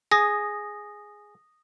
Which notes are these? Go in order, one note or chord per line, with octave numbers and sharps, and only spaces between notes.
G#4 D#6 A#6